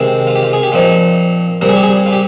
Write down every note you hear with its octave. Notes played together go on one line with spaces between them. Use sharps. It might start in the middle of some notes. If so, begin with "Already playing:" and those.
Already playing: C3 D#3 G#3 C4
F4
G4
F4
G#4
G4
A#2 F3 C4 D#4 F4
A#2 G3 C4 A#4
G#4
G4
G#4
F4
G4